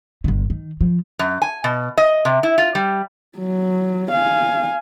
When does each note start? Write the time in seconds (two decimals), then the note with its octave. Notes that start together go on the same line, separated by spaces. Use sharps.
0.24 G1 D3
0.50 D#3
0.81 F3
1.19 F#2
1.42 G#5
1.64 B2
1.97 D#5
2.25 C3
2.43 E4
2.58 F4
2.75 G3
3.38 F#3
4.11 F5 G#5